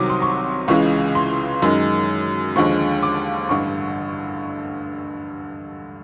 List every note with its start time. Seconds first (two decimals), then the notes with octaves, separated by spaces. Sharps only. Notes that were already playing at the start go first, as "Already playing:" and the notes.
Already playing: C2 C3 D#3 F#3 D6 D#6
0.10 C6
0.22 C#6
0.68 C#2 C#3 E3 G#3 C#6
1.15 C6
1.62 F#2 D#3 G#3
2.56 D#2 D3 F3 G#3 C#6
3.03 D6
3.49 A1 G2 D3 C#6